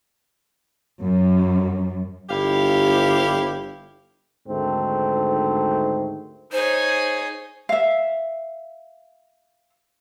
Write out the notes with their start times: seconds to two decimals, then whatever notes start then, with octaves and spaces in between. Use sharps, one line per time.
1.01 F#2
2.30 G1 E4 G4 F5
4.48 D2 G#2 D#3 A3 C4
6.52 D#4 G#4 C5 C#5
7.69 E5 F5